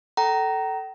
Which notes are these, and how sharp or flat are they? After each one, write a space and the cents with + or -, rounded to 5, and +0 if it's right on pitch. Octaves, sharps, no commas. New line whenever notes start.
A4 +0 G5 -40 A#5 +0